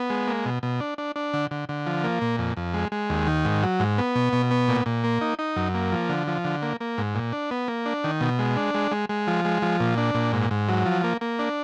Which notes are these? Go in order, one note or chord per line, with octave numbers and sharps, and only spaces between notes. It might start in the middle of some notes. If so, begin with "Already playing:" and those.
Already playing: B3
G#3
A#3
B2
B2
D4
D4
D4
D3
D3
D3
F3
A#3
A#2
F2
F2
G#3
G#3
D#2
D#3
G#2
F#3
G#2
B3
B2
B2
B3
A#2
A#2
A#3
D#4
D#4
F#2
A#3
F3
D3
F3
D3
A#3
A#3
G#2
A#2
D4
B3
A#3
D4
D#3
B2
G#3
D4
G#3
G#3
G#3
F3
G#3
F3
A#2
D4
A#2
G#2
G#2
F#3
F3
A#3
A#3
D4